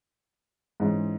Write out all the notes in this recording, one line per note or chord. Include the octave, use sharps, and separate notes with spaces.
G#2 E3 G#3 C#4